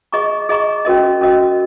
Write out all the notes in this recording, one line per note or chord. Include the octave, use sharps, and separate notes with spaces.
G#4 D#5 A#5 C#6
G#4 D#5 A#5 C#6
C#4 F#4 A#4 D#5
C#4 F#4 A#4 D#5